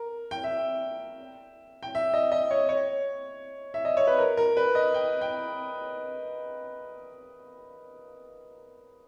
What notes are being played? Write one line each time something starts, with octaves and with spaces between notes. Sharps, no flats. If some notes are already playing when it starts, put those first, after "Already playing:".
Already playing: A#4
G5
E5
G5
E5
D#5
D#5
C#5
C#5
E5
D#5
C#5
B4
A#4
A#4
B4
D#5
G5
G5